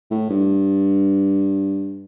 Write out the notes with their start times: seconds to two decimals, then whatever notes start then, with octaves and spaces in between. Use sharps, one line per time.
0.11 A2
0.30 G2